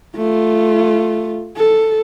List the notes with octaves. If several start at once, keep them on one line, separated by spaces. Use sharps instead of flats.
A3 F4
A4